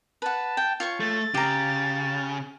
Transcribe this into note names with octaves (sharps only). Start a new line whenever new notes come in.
B4 F#5 A5
G5
F4 C#5 C#6
A3 A6
C#3 G4 A#5